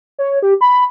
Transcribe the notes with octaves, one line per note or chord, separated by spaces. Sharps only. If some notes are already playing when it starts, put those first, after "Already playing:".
C#5
G4
B5